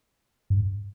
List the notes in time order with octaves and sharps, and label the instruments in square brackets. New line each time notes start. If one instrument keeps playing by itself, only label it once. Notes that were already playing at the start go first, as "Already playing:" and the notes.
[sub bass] G2